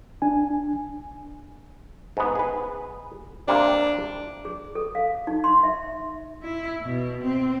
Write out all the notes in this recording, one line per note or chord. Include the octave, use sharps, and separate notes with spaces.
D4 G#5
G#2 B3
G#4 B4
C3 G3 A#3 D4
G#4
A4
F5
D#4
C6
E5
E4
B2
C4